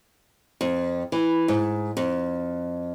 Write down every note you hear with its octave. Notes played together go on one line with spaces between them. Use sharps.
F2
E3
G#2
F2